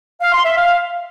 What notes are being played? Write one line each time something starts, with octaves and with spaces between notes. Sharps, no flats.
F5
C6
E5
F5